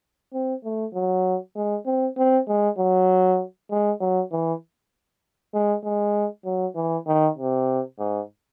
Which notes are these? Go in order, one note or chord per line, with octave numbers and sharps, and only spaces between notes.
C4
A3
F#3
G#3
C4
C4
G#3
F#3
G#3
F#3
E3
G#3
G#3
F#3
E3
D#3
C3
G#2